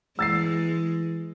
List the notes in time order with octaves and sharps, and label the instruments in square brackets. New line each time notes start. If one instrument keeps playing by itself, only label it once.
[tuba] E3 [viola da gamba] G#3 [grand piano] E6 A6 C7